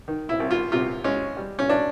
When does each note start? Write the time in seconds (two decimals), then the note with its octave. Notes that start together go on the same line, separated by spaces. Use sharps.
0.08 D#3
0.29 E4
0.40 C2
0.51 F4
0.72 C3 F4
1.04 G#3 C#4
1.37 G3
1.59 C#4
1.69 D4